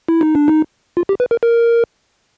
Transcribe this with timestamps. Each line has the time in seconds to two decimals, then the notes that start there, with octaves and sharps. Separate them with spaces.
0.09 E4
0.21 D#4
0.35 D4
0.48 D#4
0.97 F4
1.09 G4
1.20 B4
1.31 A#4
1.43 A#4